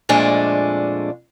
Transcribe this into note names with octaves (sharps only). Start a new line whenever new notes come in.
F2 A#2 G#3 A3 D4 G#5